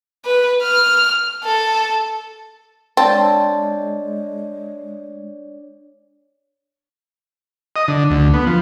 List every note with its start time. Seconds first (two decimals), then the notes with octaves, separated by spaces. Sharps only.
0.25 B4
0.62 F6
1.44 A4
2.97 G#3 C4 D4 C#5 D5 A5
7.76 D#5
7.88 D3
8.10 D2
8.34 B3
8.47 F3